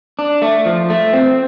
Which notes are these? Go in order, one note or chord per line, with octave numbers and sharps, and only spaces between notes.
D4
A3
F3
A3
C4